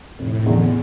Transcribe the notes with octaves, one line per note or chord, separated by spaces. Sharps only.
F1 A2
E2 D3